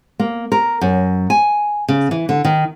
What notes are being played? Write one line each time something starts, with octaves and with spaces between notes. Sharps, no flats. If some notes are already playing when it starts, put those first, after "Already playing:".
A#3
A#4
F#2
G#5
C#3
E3
D3
D#3